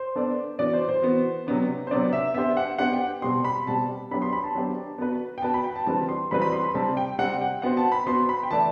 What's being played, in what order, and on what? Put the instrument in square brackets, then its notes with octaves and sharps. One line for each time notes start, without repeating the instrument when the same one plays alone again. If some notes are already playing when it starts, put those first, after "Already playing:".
Already playing: [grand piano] C5
[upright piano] B3 D4 A4 D5
[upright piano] E3 B3 F#4 [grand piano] D5
[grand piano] C5
C5
[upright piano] E3 B3 F#4
C3 F#3 B3 D4
[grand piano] C5
[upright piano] C3 F#3 B3 D4 [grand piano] D5
[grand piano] E5
[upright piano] B3 D4 G4 C5 [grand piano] E5
[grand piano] F#5
[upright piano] B3 D4 G4 C5 [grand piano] F#5
[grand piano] G5
[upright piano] B2 G3 C4 G4 [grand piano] C6
[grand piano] B5
[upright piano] B2 G3 C4 G4 [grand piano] A5
[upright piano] F#3 B3 D4 G4 C5 [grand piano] B5
[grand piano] C6
B5
A5
[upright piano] F#3 B3 D4 G4 C5
B3 F#4 B4
[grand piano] G5
[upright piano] B3 F#4 B4 [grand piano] A5
[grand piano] B5
G5
A5
[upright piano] E3 G3 C4 F#4 B4 [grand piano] A5
[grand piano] C6
[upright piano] E3 G3 C4 F#4 B4 [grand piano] B5
[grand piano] B5
C6
B5
[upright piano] C3 G3 C4 [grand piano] A5
[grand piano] G5
[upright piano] C3 G3 C4 [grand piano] F#5
[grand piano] G5
[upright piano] B3 F#4 C5 [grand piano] F#5
[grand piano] A5
B5
[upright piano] B3 F#4 C5 [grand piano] C6
[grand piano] B5
G5
[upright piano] E3 A3 E4 B4 D5 [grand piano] A5